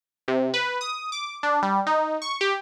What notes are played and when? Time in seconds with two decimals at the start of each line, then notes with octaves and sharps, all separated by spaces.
0.28 C3
0.54 B4
0.81 D#6
1.12 D6
1.43 D4
1.63 G3
1.87 D#4
2.22 C#6
2.41 G4